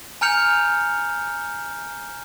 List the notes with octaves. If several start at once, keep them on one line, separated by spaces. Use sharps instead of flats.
G#5 A#5 F6 G6 C#7 F7